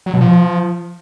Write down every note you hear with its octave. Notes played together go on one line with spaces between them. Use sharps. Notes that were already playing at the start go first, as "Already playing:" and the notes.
F#3
B2
F3